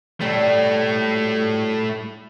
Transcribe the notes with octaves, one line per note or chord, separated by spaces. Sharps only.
A2 F#3 G3 A3